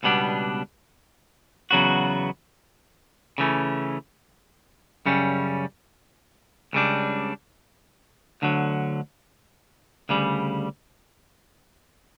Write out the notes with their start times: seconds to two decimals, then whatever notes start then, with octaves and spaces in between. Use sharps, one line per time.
0.03 C#2 B2 G3 B3 D4
1.71 E2 C#3 F#3 B3 F#4
3.38 C#3 E3 A3 C#4
5.06 F#2 C#3 G3 C#4
6.73 C#2 C#3 G3 D4
8.42 D2 D3 F#3
10.09 D2 C#3 G3